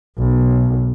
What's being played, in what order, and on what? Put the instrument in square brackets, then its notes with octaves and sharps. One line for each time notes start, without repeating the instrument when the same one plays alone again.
[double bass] B1